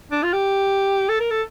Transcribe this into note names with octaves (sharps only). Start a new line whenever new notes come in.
D4
F4
G4
A4
A#4
A4